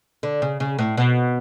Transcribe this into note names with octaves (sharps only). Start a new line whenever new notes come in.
D3
C#3
C#3
A2
B2